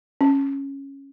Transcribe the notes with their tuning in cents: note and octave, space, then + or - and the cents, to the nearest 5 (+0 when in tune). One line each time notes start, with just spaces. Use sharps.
C#4 -10